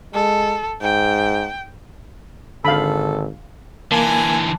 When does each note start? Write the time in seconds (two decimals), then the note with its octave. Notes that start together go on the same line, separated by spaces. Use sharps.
0.14 G#3 A4
0.82 G#2 G5
2.65 G#1 D3 A4 F5 B5
3.92 D3 E3 A#3 G#5 A5